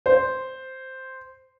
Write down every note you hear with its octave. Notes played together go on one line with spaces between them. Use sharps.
C5